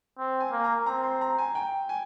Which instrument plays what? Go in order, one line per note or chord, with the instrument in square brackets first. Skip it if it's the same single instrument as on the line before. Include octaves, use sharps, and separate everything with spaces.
[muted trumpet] C4
[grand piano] G#5
[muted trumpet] A#3
[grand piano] A#5
[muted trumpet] C4 [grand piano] A#5
[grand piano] C6
A#5
G#5
G5
G#5